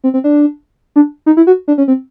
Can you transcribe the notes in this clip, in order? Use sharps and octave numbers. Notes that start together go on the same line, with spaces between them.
C4
C4
D4
D4
D#4
E4
F#4
D4
C#4
C4